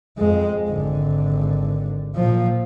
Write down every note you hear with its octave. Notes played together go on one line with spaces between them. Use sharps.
F2 G#3
G#1 D3
A#2 F3